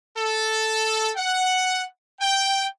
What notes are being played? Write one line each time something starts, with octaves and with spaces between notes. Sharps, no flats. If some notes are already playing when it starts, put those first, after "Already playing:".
A4
F#5
G5